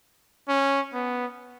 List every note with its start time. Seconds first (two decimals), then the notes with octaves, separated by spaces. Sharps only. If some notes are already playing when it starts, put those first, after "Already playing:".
0.49 C#4
0.94 B3